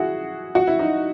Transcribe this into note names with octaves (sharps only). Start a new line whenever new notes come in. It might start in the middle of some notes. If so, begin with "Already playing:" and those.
Already playing: E4 F#4 G#4
F#4
E4
D#4